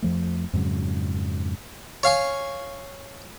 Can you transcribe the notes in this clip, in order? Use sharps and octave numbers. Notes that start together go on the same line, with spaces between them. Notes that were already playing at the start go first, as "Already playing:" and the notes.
F2 F3 A3
F2 G#2 C#3 F#3
C#5 F5 G#5 C#6